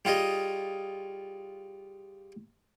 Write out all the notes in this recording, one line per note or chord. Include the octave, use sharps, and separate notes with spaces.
G3 F4 G#4 D#5